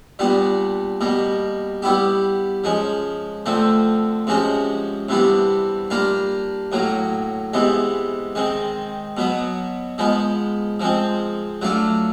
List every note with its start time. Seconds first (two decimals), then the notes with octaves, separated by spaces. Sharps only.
0.19 A#2 G3 B3 D4
1.01 B2 G3 A#3
1.82 G3 B3 E4 G4
2.64 F3 G#3 C#4
3.46 D3 F3 A3 C4
4.27 C3 F3 G#3 C#4 F#4
5.09 C3 E3 G3 B3 D4
5.90 G3 A#3 D4 F4
6.72 A2 F#3 A#3
7.54 C3 E3 G#3 B3
8.35 D#3 G#3 C4
9.17 B2 F#3 B3
9.98 F3 G#3 B3
10.80 F3 G#3 C4
11.62 F#3 A3 D4 F4